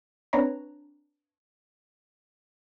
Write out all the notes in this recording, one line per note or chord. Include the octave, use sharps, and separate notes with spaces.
C4 D4 B4 C#5 A#5